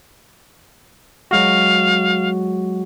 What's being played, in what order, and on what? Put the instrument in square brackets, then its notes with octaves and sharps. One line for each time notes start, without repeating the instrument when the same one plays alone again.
[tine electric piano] F#3 G#3 F#4 [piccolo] F5